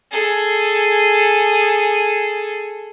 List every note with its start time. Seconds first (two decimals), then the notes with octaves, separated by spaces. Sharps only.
0.11 G#4 A4